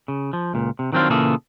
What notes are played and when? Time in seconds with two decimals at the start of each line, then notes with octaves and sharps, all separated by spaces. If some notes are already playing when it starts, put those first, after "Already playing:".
0.08 C#3
0.33 F3
0.54 C#2 A#2
0.79 C3
0.92 D#3 F#3 C4 D4 F4
1.10 A#2 C#3 E3 A#3 G#4 A4